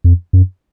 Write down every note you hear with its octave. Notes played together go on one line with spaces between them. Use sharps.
F2
F#2